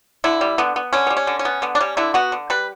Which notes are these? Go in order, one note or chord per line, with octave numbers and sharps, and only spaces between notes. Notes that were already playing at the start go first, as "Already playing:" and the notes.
D3 E4
G3
D3 B3
B3
D3 C#4
B3
G3
C#4
D3
C#4
B3
D3 B3
D4
G3 C#4
D3 E4
B3 F#4
D3
G3 B4